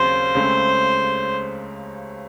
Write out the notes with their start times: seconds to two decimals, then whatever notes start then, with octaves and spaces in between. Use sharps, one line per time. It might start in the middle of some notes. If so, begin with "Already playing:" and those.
Already playing: D#2 C#3 F#3 C4 C5
0.35 C#2 C#3 A3 C4